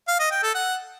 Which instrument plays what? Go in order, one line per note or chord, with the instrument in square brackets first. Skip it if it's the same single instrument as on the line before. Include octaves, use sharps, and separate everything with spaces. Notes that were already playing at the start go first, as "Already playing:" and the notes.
[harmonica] F5
D#5
G5
A4
F#5